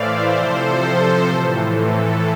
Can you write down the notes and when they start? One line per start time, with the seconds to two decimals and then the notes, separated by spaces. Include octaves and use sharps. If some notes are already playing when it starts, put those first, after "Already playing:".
Already playing: A2 E3 C5 D5 E5 F5
0.30 C3 F3 A4 C5
1.25 A2 E3
1.72 A4